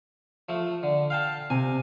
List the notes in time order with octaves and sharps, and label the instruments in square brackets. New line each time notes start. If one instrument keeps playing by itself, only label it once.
[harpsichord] F3 A3
D3
F5 G5 A5
[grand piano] C3 [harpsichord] G#5